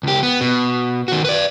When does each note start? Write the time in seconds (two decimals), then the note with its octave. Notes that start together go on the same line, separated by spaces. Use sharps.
0.03 C#2 G4
0.23 B3
0.41 B2
1.08 D#3 F#4
1.24 B4 D5